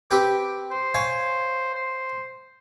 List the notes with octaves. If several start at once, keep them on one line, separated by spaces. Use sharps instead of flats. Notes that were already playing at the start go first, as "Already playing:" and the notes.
C4 G4 B4 D6
C5
C#5 F5 G#5
C5